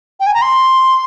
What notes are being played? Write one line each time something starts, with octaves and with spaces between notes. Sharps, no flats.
G5
G#5
A#5
C6